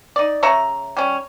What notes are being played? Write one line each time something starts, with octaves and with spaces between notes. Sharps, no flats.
D#4 D5
C#3 C#5 E5 A#5
G3 C#4